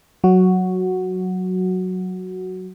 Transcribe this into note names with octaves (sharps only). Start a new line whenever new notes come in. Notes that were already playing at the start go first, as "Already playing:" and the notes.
F#3 F#4